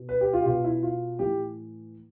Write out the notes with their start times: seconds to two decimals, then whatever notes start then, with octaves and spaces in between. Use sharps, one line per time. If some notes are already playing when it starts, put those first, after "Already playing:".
Already playing: B2
0.09 B4
0.21 G4
0.33 F4
0.42 G4
0.46 B2 F4
0.65 E4
0.83 F4
1.19 A2 E3 G4